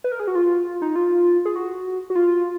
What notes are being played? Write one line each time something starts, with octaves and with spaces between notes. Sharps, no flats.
B4
A#4
G#4
F#4
F4
D#4
F4
G#4
F#4
F#4
F4